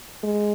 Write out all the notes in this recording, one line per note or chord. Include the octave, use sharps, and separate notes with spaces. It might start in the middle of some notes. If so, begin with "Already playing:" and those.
G#3